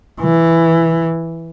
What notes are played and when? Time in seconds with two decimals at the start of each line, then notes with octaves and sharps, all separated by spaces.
0.21 E3